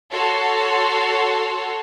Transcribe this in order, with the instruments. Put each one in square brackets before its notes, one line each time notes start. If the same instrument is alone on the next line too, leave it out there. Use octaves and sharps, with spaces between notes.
[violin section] F#4 A4 C#5 A5 C6